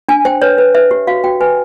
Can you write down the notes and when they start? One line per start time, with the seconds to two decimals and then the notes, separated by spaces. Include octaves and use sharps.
0.08 D4 G#5
0.25 C5 G5
0.42 B4 C#5
0.58 B4
0.75 B4 E5
0.91 G4
1.07 F#4 F5
1.24 F#4 G5
1.41 B4 G#5